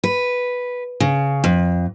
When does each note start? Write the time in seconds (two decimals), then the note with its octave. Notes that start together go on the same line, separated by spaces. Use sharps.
0.04 B4
1.00 C#3
1.44 F2